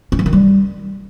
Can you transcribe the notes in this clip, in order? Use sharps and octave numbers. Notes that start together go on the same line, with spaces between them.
C#4
E3
D#3
G3